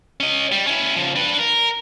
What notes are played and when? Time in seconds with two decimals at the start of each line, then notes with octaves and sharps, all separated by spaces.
0.20 C#4 D#5
0.52 G3
0.67 C#4 E4
0.97 C#3 F3
1.16 D4 B4
1.39 A#4